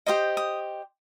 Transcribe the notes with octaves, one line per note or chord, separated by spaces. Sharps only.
G4 C5 D#5 D#6
D#6